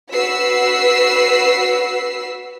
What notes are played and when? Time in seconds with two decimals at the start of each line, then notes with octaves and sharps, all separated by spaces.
0.11 F#4 B4 E6 B6 C7